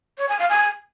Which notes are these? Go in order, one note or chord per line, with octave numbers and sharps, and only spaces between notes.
C#5
G#5
F5
G#5